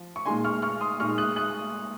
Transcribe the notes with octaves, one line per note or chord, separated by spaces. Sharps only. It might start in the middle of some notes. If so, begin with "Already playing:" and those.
Already playing: F3
C#6
A#2 G#3 D#4 G#5 C6
C#6 F6
C#6 F6
C6 D#6
A#2 G#3 D#4 C#6 F6
D#6 F#6
D#6 F#6